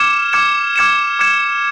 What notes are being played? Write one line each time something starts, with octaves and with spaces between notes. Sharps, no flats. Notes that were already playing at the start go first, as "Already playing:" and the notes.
Already playing: D6 F6 G#6 C#7 E7
D6 F6 G#6 C#7 E7
D6 F6 G#6 C#7 E7
D6 F6 G#6 C#7 E7